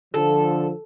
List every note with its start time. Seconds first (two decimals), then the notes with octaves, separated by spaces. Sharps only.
0.14 D3 F3 A4